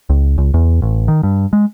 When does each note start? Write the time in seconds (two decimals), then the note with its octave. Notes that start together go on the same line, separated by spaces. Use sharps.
0.10 C#2
0.38 C#2
0.54 E2
0.82 A1
1.08 D#3
1.23 G2
1.53 G#3